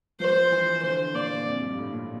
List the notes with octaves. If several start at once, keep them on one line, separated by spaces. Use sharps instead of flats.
F3 C5
E3
D3 C5
A#2 D5
F2
G2
A2
A#2